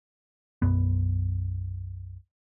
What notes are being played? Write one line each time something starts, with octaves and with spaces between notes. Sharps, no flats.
B1 F#2 B3